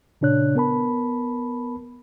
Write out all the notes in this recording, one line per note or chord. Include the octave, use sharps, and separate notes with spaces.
A#2 C#3 D4 C#5 F#6
B3 A#4 A5 B5